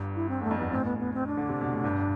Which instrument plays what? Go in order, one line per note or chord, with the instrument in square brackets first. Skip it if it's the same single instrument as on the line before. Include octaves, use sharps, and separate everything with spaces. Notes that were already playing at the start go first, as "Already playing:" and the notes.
Already playing: [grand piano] G1 G2
[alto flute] E4
C4
[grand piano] E2 [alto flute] A3
[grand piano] F2
[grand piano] G2 [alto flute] B3
[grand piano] A1 A2 [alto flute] C4
[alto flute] B3
B3
C4
D4
[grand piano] D3
C3
B2
A2
G1 G2